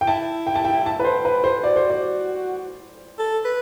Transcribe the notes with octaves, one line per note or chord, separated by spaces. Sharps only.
G5
E4 A5
G5
A5
G5
A5
B4
C5
B4
C5
F#4 D5
C5
D5
A4
B4